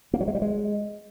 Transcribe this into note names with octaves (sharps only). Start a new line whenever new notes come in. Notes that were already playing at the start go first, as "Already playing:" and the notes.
A#3
F#3
G#3
G3
G#3